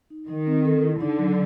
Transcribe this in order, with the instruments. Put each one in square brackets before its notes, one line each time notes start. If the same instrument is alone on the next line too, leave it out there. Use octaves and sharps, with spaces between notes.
[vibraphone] D#4
[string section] D#3 [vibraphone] D#4
[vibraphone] C4
A4
E4
[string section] D3 [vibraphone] D#4
[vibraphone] F#3